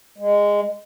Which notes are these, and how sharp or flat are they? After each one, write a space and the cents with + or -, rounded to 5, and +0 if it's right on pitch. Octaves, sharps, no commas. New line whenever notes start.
G#3 -15